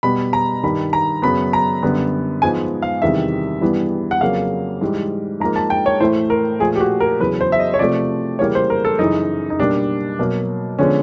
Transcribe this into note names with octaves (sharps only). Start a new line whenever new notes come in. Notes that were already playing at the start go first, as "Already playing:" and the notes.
B2 G3 B3 B5
A#5
G2 D#3 G3 B5
A#5
F#2 C#3 F#3 B3 B5
A#5
F#2 D3 G3 B3
G#2 F3 G#3 B3 G#5
F5
E2 C3 D#3 G3 E5
G2 E3 G3 B3
F#5
F2 C#3 F#3 A#3 F5
G#2 E3 G3
G#2 F3 A#3 A#5
A5
G5
C#5
A2 E3 A3 C5
A#4
A#2 F3 A3 G#4
G4
F#4
A#4
E2 C#3 F#3 B3 B4
C5
E5
D#5
C#5
C3 F3 A3 D5
C#3 E3 G3 A#3 C#5
C5
A#4
A4
F#2 C#3 E3 D#4
D#4
B2 G3 A#3 D4
B2 F#3 A#3
D3 F3 G#3 B3 C#4